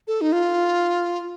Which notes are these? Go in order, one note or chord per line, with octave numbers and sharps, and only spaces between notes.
A4
D#4
F4